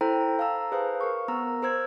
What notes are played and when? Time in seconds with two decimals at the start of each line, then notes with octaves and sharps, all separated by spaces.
0.01 E4 A4 C5 G5 A#5
0.39 F5 A5 A#5 E6
0.72 G#4 B4 C5 F5
1.01 A#4 C#6
1.28 B3 A#5 E6
1.62 A#4 C5 E6 G#6